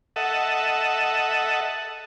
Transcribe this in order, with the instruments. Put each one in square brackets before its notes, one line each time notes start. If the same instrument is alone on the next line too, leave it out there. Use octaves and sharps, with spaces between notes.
[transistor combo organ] A4 D#5 E5 F#5